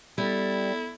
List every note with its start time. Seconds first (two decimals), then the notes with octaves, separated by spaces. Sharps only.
0.18 G3 B3 E4 A4